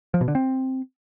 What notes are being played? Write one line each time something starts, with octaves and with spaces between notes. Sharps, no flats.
F3
B2
D3
C4